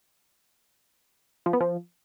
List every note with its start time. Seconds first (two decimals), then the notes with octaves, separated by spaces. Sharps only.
1.46 F3
1.53 B3
1.61 F3